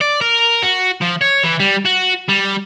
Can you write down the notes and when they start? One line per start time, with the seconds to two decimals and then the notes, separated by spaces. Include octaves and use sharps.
0.01 D5
0.21 A#4
0.63 F#4
1.01 F3
1.21 C#5
1.44 E3
1.60 G3
1.85 F#4
2.29 G3